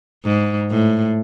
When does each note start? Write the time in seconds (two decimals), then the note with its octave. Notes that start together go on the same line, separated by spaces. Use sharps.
0.24 G#2
0.71 A2